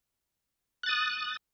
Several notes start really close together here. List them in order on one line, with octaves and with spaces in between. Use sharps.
F#6 A6 D#6